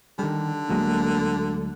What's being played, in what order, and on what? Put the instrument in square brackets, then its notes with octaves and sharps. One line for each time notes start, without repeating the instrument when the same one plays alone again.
[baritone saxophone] D3 [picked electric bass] D#3 G3
[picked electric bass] D2 F#3 G#3 [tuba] A#3